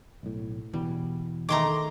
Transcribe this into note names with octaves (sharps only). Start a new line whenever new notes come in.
B1 A2
E1 B2 E3 G3
D#3 G#3 A3 A#5 C6 D6